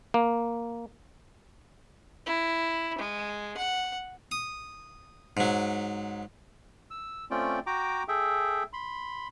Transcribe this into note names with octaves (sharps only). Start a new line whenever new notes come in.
A#3
E4
G#3
F#5
D#6
G#2 F#3
E6
A3 C4 C#4 F4 D5 G5
F#4 G5 A#5 D6
G#4 A4 E5 G5
B5 C6